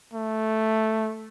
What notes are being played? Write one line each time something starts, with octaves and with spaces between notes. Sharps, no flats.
A3